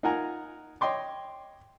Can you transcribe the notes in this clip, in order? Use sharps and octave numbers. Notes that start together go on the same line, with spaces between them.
D#4 F4 A#4 F#5 G#5 A#5
C#5 D#5 G5 C6 D6